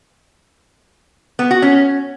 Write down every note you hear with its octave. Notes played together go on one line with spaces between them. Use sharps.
B3
F#4
C#4